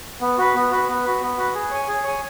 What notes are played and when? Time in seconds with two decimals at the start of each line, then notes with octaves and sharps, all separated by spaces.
0.21 B3
0.38 F#4 B4
0.55 B3
0.71 F#4 B4
0.88 B3
1.04 F#4 B4
1.22 B3
1.37 F#4 B4
1.55 G#4
1.71 C#5 G#5
1.88 G#4
2.04 C#5 G#5